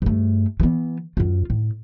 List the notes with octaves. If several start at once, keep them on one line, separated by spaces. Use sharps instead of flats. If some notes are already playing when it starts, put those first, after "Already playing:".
G2 A3
E3 B3
F#2 F4
A2